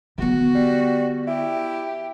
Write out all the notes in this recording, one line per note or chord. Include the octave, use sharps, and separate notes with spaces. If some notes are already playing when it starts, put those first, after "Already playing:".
D3 B3 F#4
G3
E4 G4